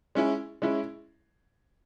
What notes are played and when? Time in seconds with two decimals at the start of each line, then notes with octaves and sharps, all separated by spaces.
0.15 G#3 C#4 E4
0.62 G#3 C#4 E4